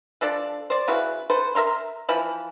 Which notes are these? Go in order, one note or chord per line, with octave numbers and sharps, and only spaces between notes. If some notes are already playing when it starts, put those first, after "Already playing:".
F3 D4 A4 D5
C5 D5
C#3 E4 F#4 B4
A4 B4 C5
A#4 E5 A#5 C6
E3 F3 B5